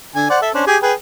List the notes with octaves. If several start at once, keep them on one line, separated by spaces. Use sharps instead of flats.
D3 G#5
C5 D5 F#5
A4 E5
C#4 D4 C5
G4 G#4 G#5
G#4 B4 G5